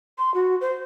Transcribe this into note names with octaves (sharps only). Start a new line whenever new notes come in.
C6
F#4
C5